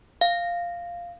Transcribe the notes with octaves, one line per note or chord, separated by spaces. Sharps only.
F5